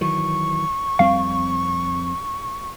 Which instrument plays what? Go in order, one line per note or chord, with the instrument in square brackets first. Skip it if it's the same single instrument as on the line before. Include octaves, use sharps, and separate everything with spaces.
[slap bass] D#3 E3 F#3 [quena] C#6
[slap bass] F2 G3 C4 [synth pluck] F5